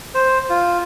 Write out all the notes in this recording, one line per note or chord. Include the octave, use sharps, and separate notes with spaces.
C5
F4